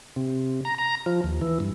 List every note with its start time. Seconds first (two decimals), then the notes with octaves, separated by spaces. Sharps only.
0.16 C3
0.65 A#5
0.78 A#5
1.06 F3
1.24 D#2
1.41 E3
1.60 G2